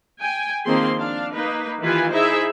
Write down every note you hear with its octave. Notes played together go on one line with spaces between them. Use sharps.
G5 G#5
D#3 F3 A#3 C4 G#4 C6
D4 F5
A#3 D#4 B4
D#3 E3 F4 G4 B4 G#5
D#4 E4 G#4 C5 E5